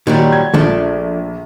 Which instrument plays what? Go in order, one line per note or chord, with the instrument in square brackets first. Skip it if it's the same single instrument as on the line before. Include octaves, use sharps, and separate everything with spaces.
[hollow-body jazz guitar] A#2 F#3 G3 [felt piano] D#3
[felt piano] G#6
[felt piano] A#1 [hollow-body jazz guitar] F3 A3 D4